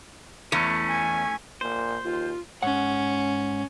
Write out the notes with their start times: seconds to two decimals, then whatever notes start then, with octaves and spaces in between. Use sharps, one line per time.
0.52 E2 A3 C#4
0.89 G#5
1.61 A#2 C5
2.04 D#2 F4
2.63 G#2 C#4 F#5